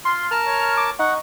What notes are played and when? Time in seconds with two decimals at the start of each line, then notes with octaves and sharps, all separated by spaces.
0.05 F4 C6
0.31 A#4 A5 F6
0.46 C#5
0.77 D6
0.99 D#4 F#5 C#6